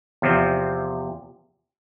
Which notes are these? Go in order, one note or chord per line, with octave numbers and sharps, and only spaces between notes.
E2 C3 F3 C4